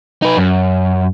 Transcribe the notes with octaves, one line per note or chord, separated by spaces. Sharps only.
D#4 B4
F#2